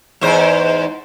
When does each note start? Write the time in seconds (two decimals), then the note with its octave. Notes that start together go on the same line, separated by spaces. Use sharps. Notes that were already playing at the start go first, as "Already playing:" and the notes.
0.21 E2 G#2 C5